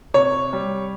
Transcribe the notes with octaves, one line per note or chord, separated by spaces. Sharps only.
C3 C#5
G3